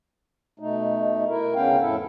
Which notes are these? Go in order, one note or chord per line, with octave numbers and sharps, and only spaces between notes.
B2 A3 D#4
E4 A#4
D2 C#3 B3 C#4 F5 G5
F2 A2 E4 A4